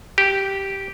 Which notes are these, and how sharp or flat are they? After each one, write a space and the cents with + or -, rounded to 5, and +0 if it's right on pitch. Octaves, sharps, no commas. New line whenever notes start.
G4 -5